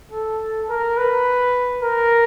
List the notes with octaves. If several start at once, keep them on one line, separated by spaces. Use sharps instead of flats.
A4
A#4
B4
A#4